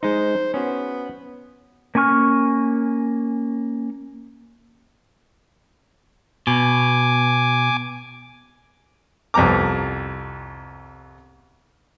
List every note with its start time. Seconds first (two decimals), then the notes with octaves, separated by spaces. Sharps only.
0.03 G#3 D#4 C5
0.54 B3 C#4 F#4
1.95 A#3 C#4 G#5 C#6 F6
6.47 B2 G#5 D6
9.34 C2 F2 B3 A#5 D6